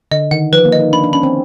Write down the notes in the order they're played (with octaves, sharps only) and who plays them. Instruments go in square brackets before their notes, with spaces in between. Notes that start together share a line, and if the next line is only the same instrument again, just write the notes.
[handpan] D3 [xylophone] D#5
[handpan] D#3 [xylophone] F#5
[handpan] F3 [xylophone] B4
[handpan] A#3
[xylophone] D#5
[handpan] D#4
[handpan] D4 [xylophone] B5
[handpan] D4
[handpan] C#4 [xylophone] B5
[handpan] C4